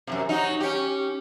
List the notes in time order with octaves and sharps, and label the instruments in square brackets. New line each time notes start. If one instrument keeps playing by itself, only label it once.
[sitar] F#2 A2 C3
F#3 D#4
C#4 G4